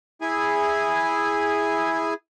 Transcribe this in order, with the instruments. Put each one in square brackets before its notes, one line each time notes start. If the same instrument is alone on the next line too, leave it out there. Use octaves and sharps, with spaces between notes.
[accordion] E4 G#4 G#5